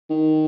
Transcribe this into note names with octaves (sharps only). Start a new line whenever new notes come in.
D#3